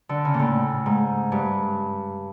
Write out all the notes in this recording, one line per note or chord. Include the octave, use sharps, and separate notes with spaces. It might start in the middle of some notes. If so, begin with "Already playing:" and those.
D3
C#3
A#2
A2
G#2
G2